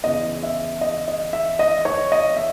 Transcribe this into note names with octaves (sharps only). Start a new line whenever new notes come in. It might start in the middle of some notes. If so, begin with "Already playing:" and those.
E2 C#3 E3 D#5
E5
D#5
D#5
E5
D#5
C#5
D#5
E5